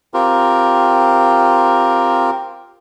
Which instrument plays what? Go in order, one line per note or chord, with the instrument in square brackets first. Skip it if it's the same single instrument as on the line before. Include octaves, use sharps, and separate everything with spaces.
[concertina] C4 F4 G4 A#4